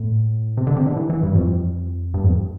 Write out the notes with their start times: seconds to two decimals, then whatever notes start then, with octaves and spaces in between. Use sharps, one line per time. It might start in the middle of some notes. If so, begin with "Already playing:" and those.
Already playing: A2
0.57 C3
0.67 D3
0.76 C3
0.87 D3
0.97 E3
1.10 E3
1.23 G2
1.35 F2
2.14 G2
2.24 F2